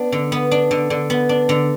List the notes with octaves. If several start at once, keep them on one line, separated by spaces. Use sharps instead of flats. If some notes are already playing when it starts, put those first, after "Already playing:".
Already playing: B3 D4
D3
B3
D4
D3
D3
B3
D4
D3